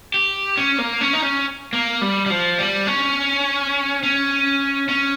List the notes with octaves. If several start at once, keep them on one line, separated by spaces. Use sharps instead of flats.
G4
C#4
A#3
C#4
D#4
C#4
A#3
G3
G3
F3
G3
C#4
C#4
C#4